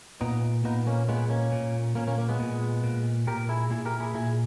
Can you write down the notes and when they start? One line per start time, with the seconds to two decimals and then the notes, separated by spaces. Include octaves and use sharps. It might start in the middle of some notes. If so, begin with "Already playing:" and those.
0.21 A#2 B3 D#4
0.64 A#2 B3 D#4
0.87 A#3 C#4
1.08 A#2 G#3 B3
1.30 A#3 C#4
1.52 A#2
1.95 A#2 A#3 C#4
2.08 A#3 C#4
2.18 A#3
2.29 G#3 B3
2.39 A#2
2.84 A#2
3.27 A#2 G4 A#4
3.49 E4 G#4
3.70 A#2 E4 G#4
3.85 G4 A#4
4.00 E4 G#4
4.14 A#2 E4 G#4